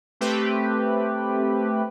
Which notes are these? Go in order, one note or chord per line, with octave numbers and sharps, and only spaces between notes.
A3 C4 G4 B4